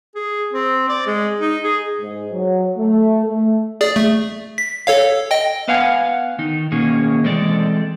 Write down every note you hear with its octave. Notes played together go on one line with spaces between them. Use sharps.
G#4
C4
D5
G#3
D#4
G#4
G#2
F#3
A3
A3
G#4 D5
A3
B6
A4 C#5 F5
D#5 G5
B3 B4 F5 F#5 G#5
D#3 D#4
B2 D#3 A#3 C#4 G#4
E3 G#3 C4 A4 D5